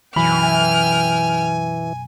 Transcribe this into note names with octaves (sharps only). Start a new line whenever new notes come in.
B1 F#2 E3 G5 G#5 B5 F6